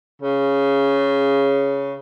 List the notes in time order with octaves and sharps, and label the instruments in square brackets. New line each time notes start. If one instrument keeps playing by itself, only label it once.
[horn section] C#3